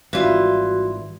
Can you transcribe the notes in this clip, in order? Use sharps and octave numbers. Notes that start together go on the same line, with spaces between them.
G#1 E3 G3 F4 F#4